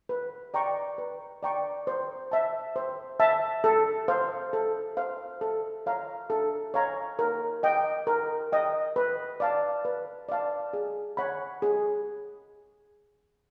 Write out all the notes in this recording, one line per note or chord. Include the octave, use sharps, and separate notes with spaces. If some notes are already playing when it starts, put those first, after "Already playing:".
B4
D5 G5 A#5 C#6
B4
D5 G5 A#5 C#6
C5
E5 A5
C5
E5 A5
A4
C5 F5
A4
C5 F5
A4
C#5 F5 A#5
A4
C#5 F5 A#5
A#4
D#5 G5
A#4
D#5 G5
B4
D5 F5 A5
B4
D5 F5 A5
G#4
C#5 F#5 B5
G#4